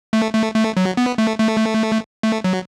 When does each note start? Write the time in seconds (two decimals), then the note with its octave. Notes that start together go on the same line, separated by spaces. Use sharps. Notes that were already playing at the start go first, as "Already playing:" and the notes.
0.13 A3
0.34 A3
0.56 A3
0.77 F#3
0.97 B3
1.18 A3
1.39 A3
2.23 A3
2.44 F#3